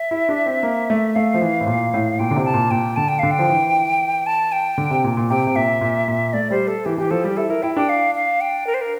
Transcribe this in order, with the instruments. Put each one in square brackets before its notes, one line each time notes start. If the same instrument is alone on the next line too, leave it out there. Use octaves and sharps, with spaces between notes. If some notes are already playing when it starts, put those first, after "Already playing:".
Already playing: [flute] E5
[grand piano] E4
D4
C4
A#3
A3
[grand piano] A3 [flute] F5
[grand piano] F3
E3
A2
A#2
A2
[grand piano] A#2 [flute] G5
[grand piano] D3
C3
[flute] A5
[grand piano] A#2
[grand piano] A#2 [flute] G5
[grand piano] D3 [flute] A5
[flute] G5
[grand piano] D3 [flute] F5
[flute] G5
[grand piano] F3
E3
[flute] A5
G5
[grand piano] D3
C3
A#2
A#2
[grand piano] C3 [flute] G5
[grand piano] C3
[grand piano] A#2 [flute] E5
[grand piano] A#2
A#2
[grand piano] A3 [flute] D5
[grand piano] G3 [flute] C5
[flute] A4
[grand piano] E3 [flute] G4
[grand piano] E3 [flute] G4
[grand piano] F3 [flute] A4
[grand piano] G3 [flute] G4
[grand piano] E4 [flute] A4
[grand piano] E4 [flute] A#4
[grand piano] E4 [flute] G5
[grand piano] D4 [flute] G5
[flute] F5
F5
G5
A#4
C5
A#4